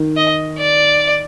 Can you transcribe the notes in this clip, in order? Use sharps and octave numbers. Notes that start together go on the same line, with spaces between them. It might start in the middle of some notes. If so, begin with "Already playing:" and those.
Already playing: D#3
D#5
D5